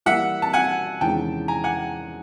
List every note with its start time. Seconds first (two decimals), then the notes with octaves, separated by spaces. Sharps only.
0.06 E3 G3 A#3 E5 F#5
0.42 A5
0.53 F#5 G#5
1.01 E2 C3 D#3 G#3 C#4 G5 A5
1.48 G#5 A#5
1.64 F#5 G#5